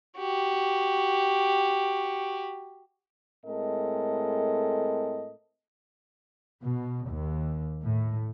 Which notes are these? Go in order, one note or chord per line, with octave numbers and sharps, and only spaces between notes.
F#4 G4
A2 G#3 C4 A4 A#4 D#5
B2
D#2
A2